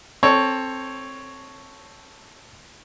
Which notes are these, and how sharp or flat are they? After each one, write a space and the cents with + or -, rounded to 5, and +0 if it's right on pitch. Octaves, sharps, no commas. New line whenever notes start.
C4 +15 A4 +0 C#5 +0